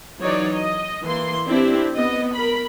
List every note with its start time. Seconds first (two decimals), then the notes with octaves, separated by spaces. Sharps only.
0.22 E3 F#3 D#4 C#5 D5
0.54 D#5
1.06 E3 A#3 C6
1.48 C4 D4 E4 G4
1.95 B3 D#5
2.34 A#4 B5